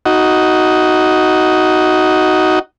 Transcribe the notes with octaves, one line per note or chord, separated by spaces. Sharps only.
D#4 F#4